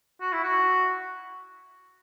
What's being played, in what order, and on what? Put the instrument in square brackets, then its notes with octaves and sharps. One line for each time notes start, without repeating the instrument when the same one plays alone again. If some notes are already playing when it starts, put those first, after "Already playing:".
[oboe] F#4
E4
F#4